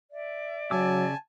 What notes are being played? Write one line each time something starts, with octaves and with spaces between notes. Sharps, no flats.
D5 E5
C#3 F#3 G#5 A5 D6 E6